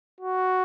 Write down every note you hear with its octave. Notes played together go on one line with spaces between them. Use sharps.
F#4